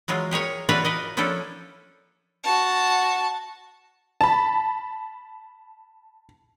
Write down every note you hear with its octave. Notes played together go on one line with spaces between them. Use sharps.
E3 F#3 G#3 F4
G4 G#4 A#4 C#5
E3 F4 F#4 B4 C#5 D5
A#4 B4 D#5
F3 C#4 D4 E4 A4
F#4 A5
A5 B5